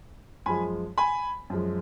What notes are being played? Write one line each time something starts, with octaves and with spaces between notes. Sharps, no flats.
F#2 F3 G#3 G#5 B5
G#5 B5
F#2 F3 G#3